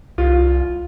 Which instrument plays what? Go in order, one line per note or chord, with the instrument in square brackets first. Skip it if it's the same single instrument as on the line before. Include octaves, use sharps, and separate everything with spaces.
[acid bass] C2 [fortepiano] F4